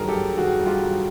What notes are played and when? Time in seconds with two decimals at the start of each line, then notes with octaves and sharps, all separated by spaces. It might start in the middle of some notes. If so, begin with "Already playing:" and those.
Already playing: G2 D#3 F#3 G#4 A#4
0.09 G4 A4
0.16 G2
0.37 D#3 F#4 G#4
0.59 G2
0.66 F4 G4
0.82 F#3